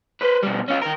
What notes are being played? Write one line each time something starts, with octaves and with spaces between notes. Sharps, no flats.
B4 C5
B2 G3
C#4 F4
D#3 A#4